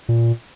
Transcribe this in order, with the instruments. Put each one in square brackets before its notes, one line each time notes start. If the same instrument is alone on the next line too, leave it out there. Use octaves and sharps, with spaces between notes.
[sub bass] A#2